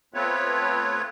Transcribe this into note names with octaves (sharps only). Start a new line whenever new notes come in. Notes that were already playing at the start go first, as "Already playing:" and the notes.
A3 B3 C4 F4 B4 C#5